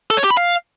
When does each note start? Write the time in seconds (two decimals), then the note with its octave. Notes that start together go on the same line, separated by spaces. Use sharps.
0.10 A4
0.17 C#5
0.24 G4
0.31 B5
0.37 F5